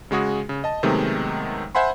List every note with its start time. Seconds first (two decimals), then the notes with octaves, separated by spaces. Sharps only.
0.11 C#3 G#3 F#4 G#4
0.49 C#3
0.64 D#5 A5
0.83 C3 D#3 F#3 G#3 A3 B3
1.75 C5 E5 F#5 G#5 B5 C6